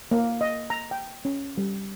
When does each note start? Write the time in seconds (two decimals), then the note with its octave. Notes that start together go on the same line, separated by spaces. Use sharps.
0.11 A#3
0.41 D#5
0.70 A#5
0.91 G5
1.25 C#4
1.58 G3